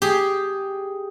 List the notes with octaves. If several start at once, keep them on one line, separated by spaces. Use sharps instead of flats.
G4 G#4